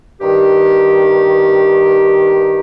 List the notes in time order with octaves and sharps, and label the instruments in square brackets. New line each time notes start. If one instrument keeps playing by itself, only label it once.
[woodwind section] G2 D#3 G4